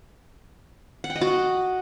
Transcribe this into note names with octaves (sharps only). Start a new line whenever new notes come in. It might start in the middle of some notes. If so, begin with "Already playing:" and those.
F#5
G5
D#5
F#4
F#5